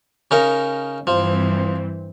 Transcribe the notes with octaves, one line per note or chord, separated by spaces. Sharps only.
C#3 D#4 A#4
G2 E3 F3 C4